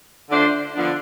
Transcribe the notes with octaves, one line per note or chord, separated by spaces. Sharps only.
D3 A3 D4 F4 C5
D3 F3 B3 D4